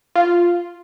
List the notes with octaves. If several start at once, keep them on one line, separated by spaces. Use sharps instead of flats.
F4